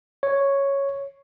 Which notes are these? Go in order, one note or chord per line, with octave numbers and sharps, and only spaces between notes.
C#5